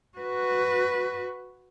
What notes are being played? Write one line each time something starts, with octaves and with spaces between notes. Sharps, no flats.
F#4 B4